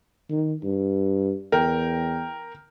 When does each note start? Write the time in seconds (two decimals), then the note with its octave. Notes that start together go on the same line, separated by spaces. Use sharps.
0.30 D#3
0.63 G2
1.52 E2 A#4 G5